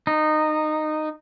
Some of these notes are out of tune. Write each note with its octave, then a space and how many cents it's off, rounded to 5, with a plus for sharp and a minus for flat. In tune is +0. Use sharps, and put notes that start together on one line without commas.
D#4 -15